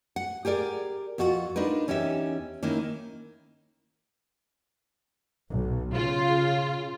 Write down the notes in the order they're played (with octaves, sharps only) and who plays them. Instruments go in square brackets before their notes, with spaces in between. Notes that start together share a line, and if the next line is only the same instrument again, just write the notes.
[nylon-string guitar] F#5
G4 G#4 A#4 D5
F2 F4 F#4 G#4 F#5
D4 D#4 F4 A#4 B4
E2 C#4 D#4 G4 E5
D#3 A#3 C#4 E4
[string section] B1
C#3 F4